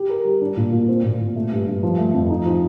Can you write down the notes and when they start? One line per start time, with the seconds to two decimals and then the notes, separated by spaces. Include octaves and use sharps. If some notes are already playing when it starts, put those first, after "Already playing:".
Already playing: G4
0.09 A#4
0.25 G3
0.41 D4
0.57 A#2
0.72 A#2
0.88 C4
1.04 A#2
1.20 A#2
1.36 A3
1.51 G2
1.67 G2
1.83 F3
1.98 A3
2.14 F2
2.30 D#4
2.45 F3